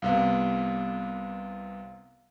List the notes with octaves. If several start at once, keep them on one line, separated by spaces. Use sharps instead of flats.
C2 C3 B3 F5